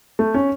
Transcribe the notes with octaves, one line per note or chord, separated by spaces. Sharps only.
A3
C#4